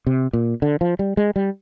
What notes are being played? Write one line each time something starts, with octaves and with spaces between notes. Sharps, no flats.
C3
A#2
D3
F3
G3
G#3
G3